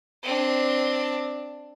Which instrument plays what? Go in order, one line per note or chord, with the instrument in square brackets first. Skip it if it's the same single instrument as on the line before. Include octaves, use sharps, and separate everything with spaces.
[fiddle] C4 D4